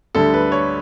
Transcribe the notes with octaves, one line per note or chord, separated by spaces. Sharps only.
D2 D3 G3 A4
B4
C#5